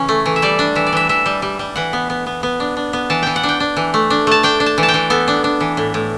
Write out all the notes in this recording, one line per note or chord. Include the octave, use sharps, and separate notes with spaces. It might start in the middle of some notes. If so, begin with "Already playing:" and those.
Already playing: C#3 E3 C#4
A3
E3
E5
G3 D5
D4
E3 E5
D5
E3 E5
E3 E5
G3
G3
G3
E3 F#5
B3
B3
B3
B3
D4
D4
B3
E3 A5
E3 G5
F#5
D4
G5
D4
E3
A3
D4
A3 A5
D4 G5
D4
A5
E3
A5
G5
E3
B3 A4
D4
D4
E3
A2
A2